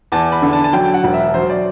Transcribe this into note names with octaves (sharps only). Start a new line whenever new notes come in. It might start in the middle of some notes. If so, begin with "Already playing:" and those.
E2 A5
B5
D3
A5
A5
F#3 G5
F#5
E1
E5
F#3 C5
D5